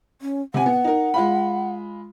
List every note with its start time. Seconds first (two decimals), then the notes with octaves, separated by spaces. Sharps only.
0.22 C#4
0.54 C3 F#5 G#5
0.66 B3
0.84 D#4 A#4
1.14 G#3 F4 B5